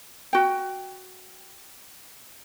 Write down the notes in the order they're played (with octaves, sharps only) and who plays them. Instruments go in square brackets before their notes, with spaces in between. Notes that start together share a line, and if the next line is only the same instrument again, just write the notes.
[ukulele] F#4 G5